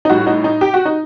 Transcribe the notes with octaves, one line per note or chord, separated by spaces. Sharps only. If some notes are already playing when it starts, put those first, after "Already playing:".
D#4
A2 G3 F#4
D#4
D#4
G4
F#4
D#4